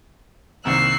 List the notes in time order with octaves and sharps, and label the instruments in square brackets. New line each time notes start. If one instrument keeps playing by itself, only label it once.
[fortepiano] C2 D#3 A#3 [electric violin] C#6 E6 [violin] F#6 C7